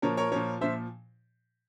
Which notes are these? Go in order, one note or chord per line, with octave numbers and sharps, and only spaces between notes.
A#2 F3 A#4 C#5
A#4 C#5
A#2 F3 A#4 C#5
A#2 F3 C5 E5